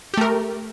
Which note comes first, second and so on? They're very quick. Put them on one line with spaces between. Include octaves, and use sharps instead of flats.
G4 A3 A#4